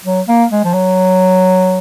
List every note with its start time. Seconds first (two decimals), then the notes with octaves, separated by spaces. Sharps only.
0.05 F#3
0.28 A#3
0.51 G#3
0.65 F3
0.73 F#3